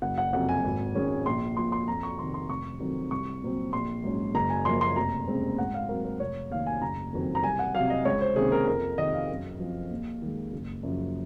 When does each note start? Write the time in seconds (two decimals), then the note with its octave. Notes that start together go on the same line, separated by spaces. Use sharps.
0.02 F#1 F#5
0.18 F#5
0.33 F2 C3 F#3 F#5
0.49 G#5
0.64 G#1
0.95 G#2 D#3 G#3 C#4
1.26 A#1 C6
1.56 A#2 F3 C6
1.72 C6
1.88 F2 A#5
2.03 C#6
2.19 C3 D#3 C6
2.34 C6
2.49 F1 C#6
2.80 F2 D#3 F#3 C4
3.11 C2 C#6
3.42 A#2 F#3 C4
3.73 A#1 C6
4.04 G#2 F#3 C#4
4.35 F#1 A#5
4.50 G#5
4.65 F#2 F3 A#3 C6
4.81 C6
4.96 F1 A#5
5.28 D#2 C#3 G#3 C4
5.58 G#2 F#5
5.74 F5
5.89 F#3 C4 A#4
6.05 A#4
6.20 F1 C#5
6.51 D#2 D#3 F5
6.66 G#5
6.82 F#1 A#5
7.13 F2 D#3 F#3 C4
7.35 A#5
7.44 C2 G#5
7.59 F#5
7.75 C3 F#3 F5
7.90 D#5
8.05 C#2 C#5
8.21 C5
8.36 C3 D#3 A#3 C#4 G#4
8.52 A#4
8.67 F2 A#4
8.98 C3 D#3 D#5
9.13 F5
9.30 F#2
9.60 F3 C4
9.91 D#2
10.22 D#3 G#3
10.53 F#1
10.83 F#2 C#3 F3